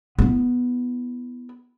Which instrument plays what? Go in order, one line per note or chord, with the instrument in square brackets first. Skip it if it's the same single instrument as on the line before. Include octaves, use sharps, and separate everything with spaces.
[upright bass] B3 E4